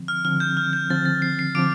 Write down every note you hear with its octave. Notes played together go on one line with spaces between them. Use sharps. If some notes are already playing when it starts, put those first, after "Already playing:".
Already playing: D3 F3 C4
F6
D3 F3 C4 F6
G6
F6
G6
D3 F3 C4 A6
A6
C7
C7
D3 F3 C4 D6 D7